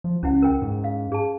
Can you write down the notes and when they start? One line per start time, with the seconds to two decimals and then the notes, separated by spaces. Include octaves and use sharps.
0.04 F3
0.23 C#2 C#4 E4 F#5
0.42 A#4 G5
0.62 G#2
0.84 F5
1.12 G#4 A5